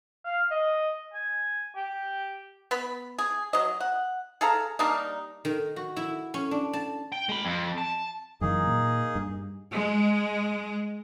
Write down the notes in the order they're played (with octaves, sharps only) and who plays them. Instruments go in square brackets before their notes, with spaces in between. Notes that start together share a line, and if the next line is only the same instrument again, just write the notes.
[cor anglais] F5
D#5
G#5
G4
[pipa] B3 B4 B5
G#4
F#3 D#5
F#5
G#4 A4 F5 A#5
G3 A#3 D4 D#4
[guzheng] D#3
F#4
E4
C#4
D4
A5
[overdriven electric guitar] G5
G#3 B5
F2
A5
[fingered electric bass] F#2 D#3 E3 [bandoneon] A#3 D#4 G#4
[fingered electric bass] A#2
G2
[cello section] G#3